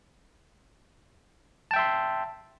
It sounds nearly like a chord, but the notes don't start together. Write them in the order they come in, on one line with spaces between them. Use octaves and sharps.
A5 G5 E5 C6